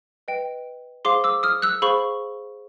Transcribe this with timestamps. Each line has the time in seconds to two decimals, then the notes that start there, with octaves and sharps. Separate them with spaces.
0.28 B4 D#5 G5
1.05 G#4 C5 F5 C6 D6
1.24 D6 E6
1.43 D#6 F6
1.62 E6 F#6
1.82 G#4 C5 F5 B5 C#6